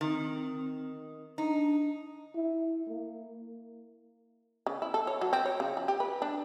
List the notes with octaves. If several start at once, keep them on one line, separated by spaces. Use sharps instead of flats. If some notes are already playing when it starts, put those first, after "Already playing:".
D#3 C4
D4 D#4
E4
A#3
C#3
E4
A4
C#5
F#3
C4
C#5
C#3
F3
G4
B4
D4